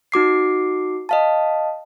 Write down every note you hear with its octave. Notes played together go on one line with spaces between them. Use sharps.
D#4 F#4 D6 C7
D#5 F5 A5